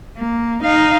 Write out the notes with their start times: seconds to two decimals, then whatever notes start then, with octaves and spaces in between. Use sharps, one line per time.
0.18 A#3
0.64 D#4 F5